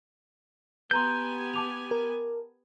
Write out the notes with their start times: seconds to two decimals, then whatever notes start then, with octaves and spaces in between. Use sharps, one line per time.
0.91 B3 G4 B4 G#5 A#5 C6 G6
1.54 A5 D6 F7
1.91 A#4